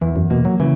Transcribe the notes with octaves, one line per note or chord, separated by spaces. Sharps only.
E2 E3
F#2
B2 A#3
F#3
C#3 E3